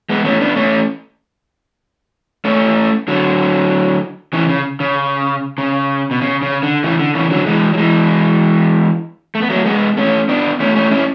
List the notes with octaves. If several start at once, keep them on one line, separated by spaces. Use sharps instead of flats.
G#3 B3
A3 C#4
B3 D4
A3 C#4
A3 C#4
D3 F#3
C#3 E3
C#3
C#3
C#3
B2
C#3
C#3
D3
C#3 E3
D3
C#3 E3
D3 F#3
E3 G#3
F#3
E3 G#3
A3
B3
F#3 A3
G#3 B3
A3 C#4
B3 D4
A3 C#4
A3 C#4
C#4 E4